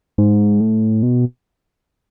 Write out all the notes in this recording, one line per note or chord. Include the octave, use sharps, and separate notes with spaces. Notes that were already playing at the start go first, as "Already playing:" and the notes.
G#2
A2
B2